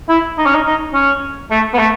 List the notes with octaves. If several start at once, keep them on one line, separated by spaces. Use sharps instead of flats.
E4
D#4
C#4
D#4
D#4
C#4
A3
B3
A3